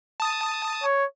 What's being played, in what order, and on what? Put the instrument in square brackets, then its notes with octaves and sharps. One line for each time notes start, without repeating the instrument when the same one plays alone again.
[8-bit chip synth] A5 D#6
[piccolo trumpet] C#5